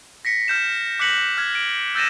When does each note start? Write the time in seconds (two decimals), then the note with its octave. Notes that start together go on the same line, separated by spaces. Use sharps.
0.25 A#6 B6 C#7
0.48 F6 G6 E7
0.99 D6 F#6 A#6 B6 C#7 F#7
1.37 F6 G#6
1.55 D7
1.95 E6 G6 A6 A#6 D#7 E7